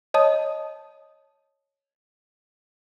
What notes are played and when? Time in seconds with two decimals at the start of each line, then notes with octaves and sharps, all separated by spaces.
0.14 C#5 D#5 A5 D#6